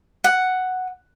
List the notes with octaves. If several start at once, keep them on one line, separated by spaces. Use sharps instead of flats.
F#5